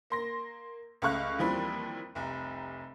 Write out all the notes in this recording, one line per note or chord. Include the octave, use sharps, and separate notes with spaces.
A#3 C6 A#6
C#2 A3 F5 C#6 F#6
D#2 E3 F3 G3 C4
F1 C2